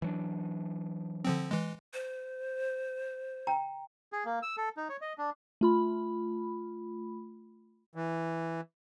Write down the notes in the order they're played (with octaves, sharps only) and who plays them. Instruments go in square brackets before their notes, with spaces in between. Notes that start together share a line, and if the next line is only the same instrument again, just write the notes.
[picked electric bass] E3 F#3 D4
[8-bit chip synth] D3 F3 C4
E3 G#3
[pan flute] C5
[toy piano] G5 A#5
[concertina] G#4
A#3
E6
A4
D#4
C#5
D#5
D4
[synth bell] A3 F4 B5
[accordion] E3